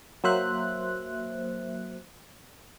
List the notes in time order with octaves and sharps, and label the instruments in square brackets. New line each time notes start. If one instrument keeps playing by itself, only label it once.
[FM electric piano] F#3 A#3 C5 E5 F#6